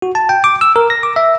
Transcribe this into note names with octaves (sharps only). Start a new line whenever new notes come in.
F#4
A5
G5
D6
E6
A#4
A#6
D6
E5